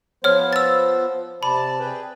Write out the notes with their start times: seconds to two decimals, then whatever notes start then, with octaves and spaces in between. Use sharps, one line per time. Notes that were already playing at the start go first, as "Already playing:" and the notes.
0.24 F3 B3 C5 C#5 F6
0.53 E6 A6
1.43 C3 D5 A5 B5
1.80 G#4 B4 G5